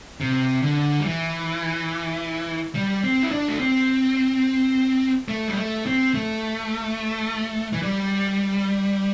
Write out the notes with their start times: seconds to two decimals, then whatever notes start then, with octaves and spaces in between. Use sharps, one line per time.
0.21 C3
0.63 D3
1.00 G3
1.06 E3
2.75 G3
3.03 C4
3.23 E4
3.31 D4
3.48 A3
3.59 C4
5.28 A3
5.47 G3
5.57 A3
5.86 C4
6.14 A3
7.73 E3
7.82 G3